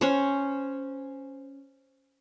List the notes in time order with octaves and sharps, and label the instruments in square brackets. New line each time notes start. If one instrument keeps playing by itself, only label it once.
[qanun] C#4 C5